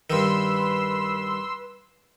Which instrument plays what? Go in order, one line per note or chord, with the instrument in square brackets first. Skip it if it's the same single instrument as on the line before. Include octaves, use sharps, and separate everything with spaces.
[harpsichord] G2 D#3 [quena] B4 [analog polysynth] C6 E6